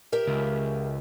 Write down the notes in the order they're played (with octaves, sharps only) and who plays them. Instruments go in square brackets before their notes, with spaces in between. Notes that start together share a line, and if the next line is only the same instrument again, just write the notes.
[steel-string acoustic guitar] G4 A#4 E5
[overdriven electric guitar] C#2